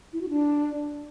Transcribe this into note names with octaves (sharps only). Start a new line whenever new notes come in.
E4
F#4
D4